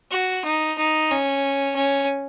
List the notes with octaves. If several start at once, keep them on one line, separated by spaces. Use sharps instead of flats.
F#4
D#4
D#4
C#4
C#4